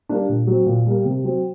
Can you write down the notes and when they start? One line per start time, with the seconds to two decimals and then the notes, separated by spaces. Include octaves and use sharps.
0.09 G3 A#3 D4
0.29 A#2
0.47 F#3 C4
0.66 A#2
0.86 G3 A#3
1.05 C3
1.24 F#3 C4